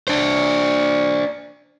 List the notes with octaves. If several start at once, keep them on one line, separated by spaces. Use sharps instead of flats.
D4 C5